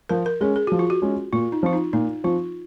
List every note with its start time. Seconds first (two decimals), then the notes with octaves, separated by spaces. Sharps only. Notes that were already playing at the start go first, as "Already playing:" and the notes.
0.09 F3 A#4
0.26 A#4
0.41 G#3 C#4 G#4
0.56 G#4
0.67 F3 F#4
0.79 F4
0.90 F#4
1.02 G#3 C#4
1.33 A#2 F4
1.52 D#4
1.63 F3 C4 F4
1.73 D#4
1.93 A#2 D#4
2.24 F3 C4 F4